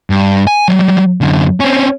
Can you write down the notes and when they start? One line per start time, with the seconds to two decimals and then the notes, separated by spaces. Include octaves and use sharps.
0.10 G2
0.47 G#5
0.68 F#3 G3
1.21 F#2 D3
1.60 C4 C#4